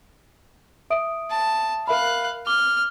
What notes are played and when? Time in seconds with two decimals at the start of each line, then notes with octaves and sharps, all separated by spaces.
0.90 E5 D#6 D7
1.31 A5
1.88 A#4 E5 F5 B5 F#6
2.47 D6 F6 G7